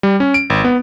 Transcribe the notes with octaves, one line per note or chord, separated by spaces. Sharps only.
G3
C#4
D7
G#1
B3